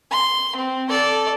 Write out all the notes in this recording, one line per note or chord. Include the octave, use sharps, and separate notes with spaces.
C6
C4
A4 D5